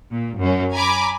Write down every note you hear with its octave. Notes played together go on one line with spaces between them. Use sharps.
A#2
F#2 C#4
G#5 A#5 B5 D6